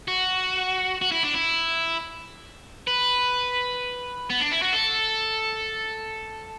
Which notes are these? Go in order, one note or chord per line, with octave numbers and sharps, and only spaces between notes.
F#4
F#4
E4
D4
E4
B4
B3
D4
E4
F#4
A4